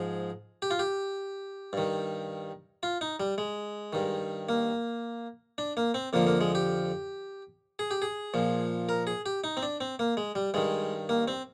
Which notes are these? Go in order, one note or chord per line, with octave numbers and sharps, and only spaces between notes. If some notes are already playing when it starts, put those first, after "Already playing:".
Already playing: G#2 F3 G#4
G4
F4
G4
G2 D#3
F4
D#4
G3
G#3
G2 D#3
A#3
D4
A#3
C4
F2 D3 F3 A#3
A#3
G#3
G4
G#4
G4
G#4
A#2 F3
A#4
G#4
G4
D#4
C4
D4
C4
A#3
G#3
G3
G2 D#3 G#3
A#3
C4